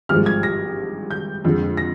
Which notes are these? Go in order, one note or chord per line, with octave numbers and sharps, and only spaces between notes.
G#1 G2 F3 G#3 F6
G#6
A#6
G6
F2 D3 G#3
A#6